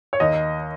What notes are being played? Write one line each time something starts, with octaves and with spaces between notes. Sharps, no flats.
C#5
D#2 D#5